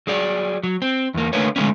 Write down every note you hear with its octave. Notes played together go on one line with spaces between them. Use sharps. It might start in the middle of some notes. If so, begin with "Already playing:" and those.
F#3 G#4 D5
F#3
C4
E2 A#3
D3 A3 A#3 B4 C#5
D3 G#3 A3 B3 C#4